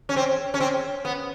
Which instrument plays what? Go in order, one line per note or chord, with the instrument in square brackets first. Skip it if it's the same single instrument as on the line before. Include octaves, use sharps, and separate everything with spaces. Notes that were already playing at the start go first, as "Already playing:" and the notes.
[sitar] C#4
C4
C#4
C4
B3